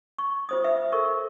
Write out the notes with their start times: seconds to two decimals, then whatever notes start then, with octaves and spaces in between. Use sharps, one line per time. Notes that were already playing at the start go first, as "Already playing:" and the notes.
0.18 C#6
0.49 F4 C5 D#6
0.64 B4 E5
0.92 A4 A#4 C#6